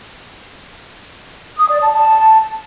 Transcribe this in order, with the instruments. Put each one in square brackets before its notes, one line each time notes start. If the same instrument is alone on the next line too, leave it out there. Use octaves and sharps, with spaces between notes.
[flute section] D#6
D5
A5
A5